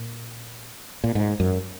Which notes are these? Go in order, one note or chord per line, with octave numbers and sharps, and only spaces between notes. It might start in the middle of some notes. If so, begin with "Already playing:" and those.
Already playing: A#2
A#2
G#2
F#2